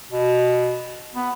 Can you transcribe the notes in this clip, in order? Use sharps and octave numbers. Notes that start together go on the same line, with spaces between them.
B2
B3